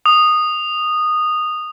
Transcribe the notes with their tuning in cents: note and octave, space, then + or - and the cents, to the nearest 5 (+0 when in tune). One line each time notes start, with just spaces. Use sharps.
D#6 -15